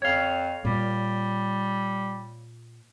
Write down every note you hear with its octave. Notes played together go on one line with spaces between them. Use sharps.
F2 C#5 F5
A#2 G3